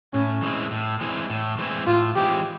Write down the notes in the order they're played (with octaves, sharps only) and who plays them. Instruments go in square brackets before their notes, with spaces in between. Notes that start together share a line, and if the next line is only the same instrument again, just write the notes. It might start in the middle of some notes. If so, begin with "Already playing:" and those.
[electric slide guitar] A2 [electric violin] C#4
[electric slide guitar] E3 G#3 C4 E4
A2
E3 G#3 C4 E4
A2
E3 G#3 C4 E4
[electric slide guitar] A2 [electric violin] F4
[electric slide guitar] E3 G#3 C4 E4 [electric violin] G4